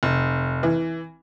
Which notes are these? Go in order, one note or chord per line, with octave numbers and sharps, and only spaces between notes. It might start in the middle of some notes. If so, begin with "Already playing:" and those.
F1
E3